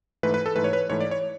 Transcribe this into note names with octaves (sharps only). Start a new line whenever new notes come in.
G#2 E3 A3 B4
B4
A4
G#2 E3 A3 B4
C#5
B4
G#2 E3 A3 C#5
D5
C#5